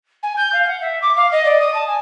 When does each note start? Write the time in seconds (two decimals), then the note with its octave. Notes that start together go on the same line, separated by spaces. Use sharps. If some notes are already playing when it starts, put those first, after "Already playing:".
0.23 G#5
0.37 G6
0.53 F5
0.67 F#5
0.81 E5
1.02 D6
1.16 F5
1.31 D#5
1.45 D5
1.59 D#6
1.74 A5
1.87 G#5